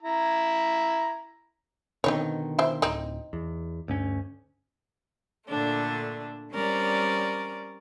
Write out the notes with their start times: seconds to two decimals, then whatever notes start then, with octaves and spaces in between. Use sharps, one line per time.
0.03 E4 A#5
2.04 B2 D3 D#3 C4 D#4 C#5
2.59 E3 C5 E5
2.82 D1 C4 D#4
3.33 E2
3.88 D2 G2 C#4
5.48 A#2 D3 A3 D4
6.51 G3 C4 C#4 A#4 D5